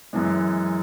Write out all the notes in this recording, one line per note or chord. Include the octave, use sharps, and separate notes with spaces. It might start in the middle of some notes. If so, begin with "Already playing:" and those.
F#2 E3 G#3